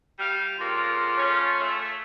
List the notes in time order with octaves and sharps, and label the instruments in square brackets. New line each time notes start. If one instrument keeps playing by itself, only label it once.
[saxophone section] G3 F5
[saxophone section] F2 C#3 A#3 [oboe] F4
[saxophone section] A3 C#4
A3